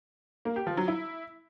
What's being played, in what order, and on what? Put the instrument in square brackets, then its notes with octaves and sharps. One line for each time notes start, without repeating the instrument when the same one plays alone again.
[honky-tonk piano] A#3
G4
F3
F#3
E4